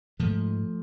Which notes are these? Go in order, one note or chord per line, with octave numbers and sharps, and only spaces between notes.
G#2 F3 A3